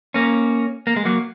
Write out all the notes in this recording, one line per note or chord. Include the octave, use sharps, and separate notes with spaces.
A#3 C#4
A#3
G#3
F#3 A#3